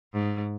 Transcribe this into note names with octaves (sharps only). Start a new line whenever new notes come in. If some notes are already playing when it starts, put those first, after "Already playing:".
G#2